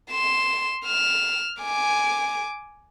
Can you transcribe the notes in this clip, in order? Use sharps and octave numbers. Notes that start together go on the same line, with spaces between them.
C6 E7
F6 E7
G#5 D6